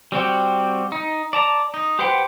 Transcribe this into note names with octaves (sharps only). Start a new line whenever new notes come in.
G3 C4 F#4 G4
D#4
D5 A5 A#5
D#4
G4 B4 C5 F#5 G5